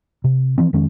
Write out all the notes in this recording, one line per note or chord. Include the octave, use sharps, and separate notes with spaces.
C3
E3 F3 C4
F2 D#3 G#3 C#4